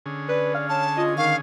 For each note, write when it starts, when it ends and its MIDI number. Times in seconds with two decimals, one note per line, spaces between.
0.06 1.41 50
0.06 1.41 61
0.06 1.41 68
0.29 0.54 71
0.29 0.67 74
0.54 0.82 77
0.69 0.86 73
0.69 1.03 81
0.97 1.14 65
0.97 1.12 75
1.17 1.36 51
1.17 1.35 77
1.17 1.33 85